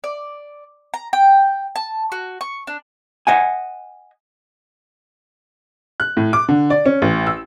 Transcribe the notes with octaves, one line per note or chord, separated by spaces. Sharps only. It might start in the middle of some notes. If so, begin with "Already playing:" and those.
D5
A#5
G5
A5
F#4
C#6
D4
D#5 F#5 G#5
F#6
A2
D6
D3
D5
C#4
A1
E6